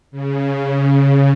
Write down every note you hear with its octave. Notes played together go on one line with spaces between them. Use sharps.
C#3